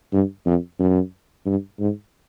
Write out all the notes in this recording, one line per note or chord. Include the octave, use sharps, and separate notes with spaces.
G2
F2
F#2
G2
G#2